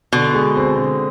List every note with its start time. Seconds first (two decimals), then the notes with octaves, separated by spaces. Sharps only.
0.12 B2 D3
0.34 G#3
0.56 C4
0.78 D3